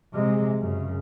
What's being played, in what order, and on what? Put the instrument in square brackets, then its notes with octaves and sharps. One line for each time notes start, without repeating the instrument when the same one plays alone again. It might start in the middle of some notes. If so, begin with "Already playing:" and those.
[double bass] C3 G#3
F#2 C#3